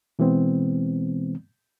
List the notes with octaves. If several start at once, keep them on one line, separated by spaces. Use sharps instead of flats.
B2 E3 G#3 B3 C4